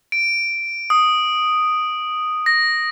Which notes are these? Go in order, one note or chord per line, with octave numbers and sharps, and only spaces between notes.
D7
D#6
A#6